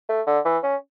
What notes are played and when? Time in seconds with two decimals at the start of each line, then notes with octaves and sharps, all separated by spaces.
0.09 A3
0.27 D3
0.45 E3
0.63 C#4